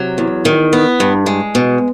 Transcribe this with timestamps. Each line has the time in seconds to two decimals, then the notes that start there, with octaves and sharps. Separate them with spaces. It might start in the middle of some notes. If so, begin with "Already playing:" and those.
Already playing: C3 F#3
0.18 E2
0.45 D#3
0.73 B3
1.00 G2
1.26 G#3
1.55 B2